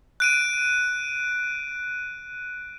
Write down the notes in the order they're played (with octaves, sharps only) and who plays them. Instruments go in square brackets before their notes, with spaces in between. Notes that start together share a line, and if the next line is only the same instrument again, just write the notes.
[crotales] F#6 D7 D#7